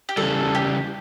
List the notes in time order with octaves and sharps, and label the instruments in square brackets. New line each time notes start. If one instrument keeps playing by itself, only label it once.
[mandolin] G4
[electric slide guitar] C#3 E3 G3 [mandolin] A4
[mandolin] G4